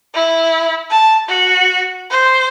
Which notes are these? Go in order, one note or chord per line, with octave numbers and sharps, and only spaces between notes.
E4
A5
F#4
C5